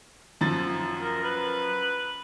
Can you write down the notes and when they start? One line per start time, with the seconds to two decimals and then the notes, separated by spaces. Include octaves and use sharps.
0.41 F#2 F3 A6
1.01 A#4
1.23 B4